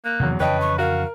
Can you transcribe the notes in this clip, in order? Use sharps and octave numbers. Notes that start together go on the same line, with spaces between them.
A#3 F#6
E2 C3 D#3 E3 F#3
F2 C#3 E3 B4 C#5 D#5 G5 A5
C#6
F#4 A#4 F5